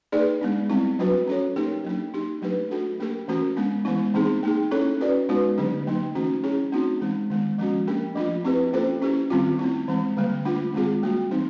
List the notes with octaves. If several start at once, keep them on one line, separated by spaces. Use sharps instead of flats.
A#3 D#4 G#4 B4 D5
G#3 B3 D4
G3 C4 E4
F#3 A3 D4 F#4 B4
C#4 F#4 A4 C#5
A#3 D#4 G4 A#4
F#3 A#3 D4
F#3 A#3 D#4 G4
F#3 A3 D4 G4 B4
A3 D4 F#4 A4
A#3 D4 G4 A#4
E3 A3 C#4 F#4 A#4
G#3 B3 D4
E3 G#3 B3 E4
E3 A3 C4 D#4 G#4
A#3 D#4 G#4
C#4 E4 A4 C#5
C#4 F#4 B4 D5
G#3 B3 D#4 F#4 B4
D3 F#3 A3 D4 G4
F#3 A#3 D#4
E3 A3 C#4 F#4
C#4 E4 G#4 C#5
A3 C4 D#4 F#4
E3 G#3 C4
D#3 G#3 B3
F3 G#3 C#4 F#4
A#3 D4 G4 A#4
F3 A3 D4 F4
C4 E4 G4 B4
A#3 C#4 F4 A4 C5
C#4 E4 G4
D#3 G3 C4 F4
A3 C4 E4
E3 G#3 C4
D3 G3 A#3
A3 D4 F4
D#3 G#3 C4 F4 G#4
G3 A#3 D4 F#4
E3 G3 C4 D#4